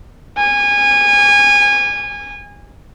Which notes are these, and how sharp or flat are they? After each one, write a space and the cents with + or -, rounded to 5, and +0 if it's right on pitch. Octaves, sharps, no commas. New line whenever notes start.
G#5 -25